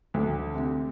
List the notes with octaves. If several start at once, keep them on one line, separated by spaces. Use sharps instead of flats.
D2
C3